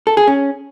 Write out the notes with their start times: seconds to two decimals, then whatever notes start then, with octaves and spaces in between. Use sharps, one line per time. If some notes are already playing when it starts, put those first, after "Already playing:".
0.07 A4
0.17 G#4
0.27 C#4